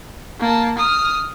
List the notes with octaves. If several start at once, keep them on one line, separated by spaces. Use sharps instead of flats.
A#3 A5
D#6 F6